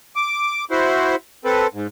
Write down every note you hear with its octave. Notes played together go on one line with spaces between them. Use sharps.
D6
E4 F#4 C5
C4 A4 B4
G#2